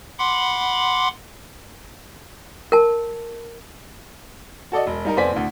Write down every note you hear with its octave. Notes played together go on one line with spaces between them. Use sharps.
F#5 B5 C6 D6
A#4 A5
F#4 A4 D5 D#5
E1
G3 D#4 A#4
F1 B3 C5 D5 G#5 B6
D2 A2